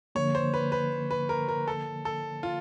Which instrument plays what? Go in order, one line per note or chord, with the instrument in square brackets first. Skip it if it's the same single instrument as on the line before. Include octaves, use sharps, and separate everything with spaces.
[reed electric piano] D3 F3 A#3 [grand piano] C#5
[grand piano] C5
B4
B4
B4
A#4
A#4
A4
A4
F4